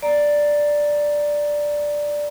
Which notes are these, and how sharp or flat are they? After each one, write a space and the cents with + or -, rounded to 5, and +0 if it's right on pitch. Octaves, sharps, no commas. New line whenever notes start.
D5 +0 A#5 +0